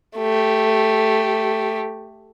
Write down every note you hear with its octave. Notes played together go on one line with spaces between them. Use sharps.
A3 G4